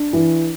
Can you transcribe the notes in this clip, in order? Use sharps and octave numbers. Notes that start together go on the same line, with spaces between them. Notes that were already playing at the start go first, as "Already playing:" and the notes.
Already playing: D4
E3